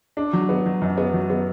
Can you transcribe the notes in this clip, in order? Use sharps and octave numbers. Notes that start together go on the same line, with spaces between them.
D4
F#3
B3
F#3
F#2
B3
F#3
B3